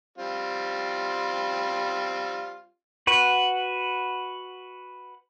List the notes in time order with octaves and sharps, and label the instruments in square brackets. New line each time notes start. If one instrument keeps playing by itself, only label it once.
[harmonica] G3 C4 F4
[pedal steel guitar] F#4 B4 F#5